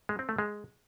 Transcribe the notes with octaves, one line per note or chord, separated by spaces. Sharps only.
G#3
C4
A3
G#3